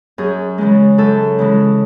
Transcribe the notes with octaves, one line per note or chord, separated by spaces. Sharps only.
F#2 G#4
C#3 E3 G#3
F#2 A4
C#3 E3 G#3